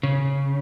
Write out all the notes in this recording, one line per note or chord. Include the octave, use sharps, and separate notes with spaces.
C#3